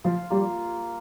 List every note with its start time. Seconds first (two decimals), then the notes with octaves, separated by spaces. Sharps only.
0.04 F3 F4
0.30 G3 A#3